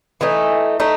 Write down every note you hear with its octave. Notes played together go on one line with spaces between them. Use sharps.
E3 A3 D#4
A3 D#4